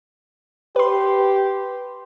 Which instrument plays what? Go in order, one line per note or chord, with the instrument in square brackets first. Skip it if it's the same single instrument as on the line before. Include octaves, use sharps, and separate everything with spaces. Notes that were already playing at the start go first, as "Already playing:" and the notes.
[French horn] G4 [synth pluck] B4 C6